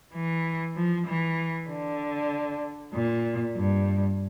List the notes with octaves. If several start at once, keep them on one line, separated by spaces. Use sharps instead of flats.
E3
F3
E3
D3
A#2
G2